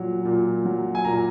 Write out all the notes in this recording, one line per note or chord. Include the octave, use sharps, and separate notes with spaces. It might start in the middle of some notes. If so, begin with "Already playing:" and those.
Already playing: A#2 F#3
A#2
F#3
G#5
A#2 A#5